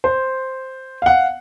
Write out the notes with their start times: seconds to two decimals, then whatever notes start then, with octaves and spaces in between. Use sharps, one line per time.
0.04 C5
1.02 F5 F#5